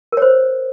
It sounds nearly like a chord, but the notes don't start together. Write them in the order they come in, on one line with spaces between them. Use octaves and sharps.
A#4 C#5 C5